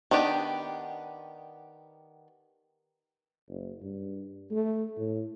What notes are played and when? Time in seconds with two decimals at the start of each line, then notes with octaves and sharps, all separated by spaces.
0.11 D#3 B3 D4 G4 D5
3.49 F#1
3.82 G2
4.51 A3
4.97 A2